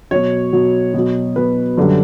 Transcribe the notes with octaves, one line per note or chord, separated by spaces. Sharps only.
B2 F#3 C#5
B2 F#3
B2 F#3
B2 F#3 B4
F#2 D3 G3